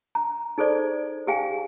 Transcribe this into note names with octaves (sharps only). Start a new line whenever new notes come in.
A#5
D#4 G#4 A4 C5 D5
G4 G#4 F5 G5 G#5